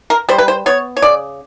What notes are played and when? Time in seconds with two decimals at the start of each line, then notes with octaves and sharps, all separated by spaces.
0.10 A#4
0.29 G3 C5
0.38 B4
0.48 C5
0.66 B3 C#5
0.97 C#5
1.02 C#3 D5